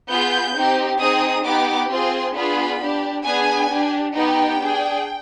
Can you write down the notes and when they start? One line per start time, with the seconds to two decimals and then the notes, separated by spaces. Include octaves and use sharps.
0.09 B3 F4 G#4 G6
0.55 C4 D#4 G4
0.99 C4 D#4 G#4 D#6
1.44 B3 D#4 G4 D6
1.89 C4 F4 G#4 C6
2.35 B3 D4 F4 G#4 B5
2.80 D4 G4
3.25 B3 D4 G#4 G#5
3.70 D4 G4
4.14 B3 D#4 G4 G5
4.59 D4 G#4